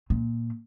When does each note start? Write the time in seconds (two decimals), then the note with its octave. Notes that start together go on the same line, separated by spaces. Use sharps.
0.10 A#2